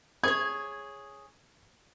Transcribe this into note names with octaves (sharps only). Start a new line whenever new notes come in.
G#4 C#5 G#6